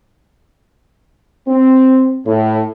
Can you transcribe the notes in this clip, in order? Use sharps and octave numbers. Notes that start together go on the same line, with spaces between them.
C4
A2